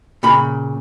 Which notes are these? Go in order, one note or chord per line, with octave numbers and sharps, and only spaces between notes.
A#2 C#3 B5